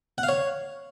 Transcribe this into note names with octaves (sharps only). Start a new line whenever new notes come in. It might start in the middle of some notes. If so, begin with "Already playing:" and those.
F#5
F5
C#5